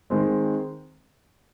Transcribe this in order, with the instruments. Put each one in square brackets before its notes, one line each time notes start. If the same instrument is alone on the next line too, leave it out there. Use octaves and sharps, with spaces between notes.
[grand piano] D#3 G#3 C4